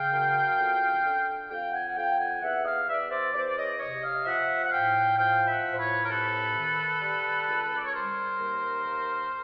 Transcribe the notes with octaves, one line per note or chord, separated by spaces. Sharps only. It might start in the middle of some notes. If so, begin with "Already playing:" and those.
Already playing: C#3 F5 G5
F#2
F2
D3
F2 F5 G5
F#5 G#5
F#5
F2 F5 G5
F#5 G#5
E2 E5 F#5
D#5 F5
E2 D5 E5
C5 D5
E2 C5 D5
D5
C#5 D#5
C3 C#5 D#5
D#5 F5
F3 E5 F#5
F#5
A2 F5 G5
F3 F5 G5
E5 F#5
A2
C5
B4 C#5
A#4
C3 A4 B4
D#3
G3
C#2
D5
C#5
G3 A#4 C5
D#2
D#2